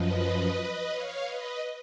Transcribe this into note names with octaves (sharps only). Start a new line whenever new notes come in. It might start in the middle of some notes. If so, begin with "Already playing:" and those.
Already playing: F#2 F3 B4 D#5
C#5 F5
B4 D#5